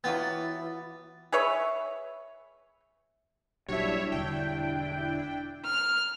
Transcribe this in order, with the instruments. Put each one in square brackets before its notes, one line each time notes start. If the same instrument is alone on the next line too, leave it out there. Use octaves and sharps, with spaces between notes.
[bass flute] E3 [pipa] F#3 F4 G5 [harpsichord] B3 [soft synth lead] A6
[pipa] G#4 B4 C#5 E5
[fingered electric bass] A#1 F#3 [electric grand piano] G3 F#4 [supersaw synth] D4 E4 [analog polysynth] C#5 E5
[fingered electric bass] E1 D3 [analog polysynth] G5
[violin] F6